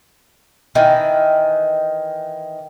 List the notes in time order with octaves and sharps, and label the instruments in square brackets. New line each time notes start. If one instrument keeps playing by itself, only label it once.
[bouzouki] D#3 E3